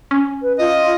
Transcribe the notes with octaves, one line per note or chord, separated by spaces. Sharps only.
C#4
B4
F4 D#5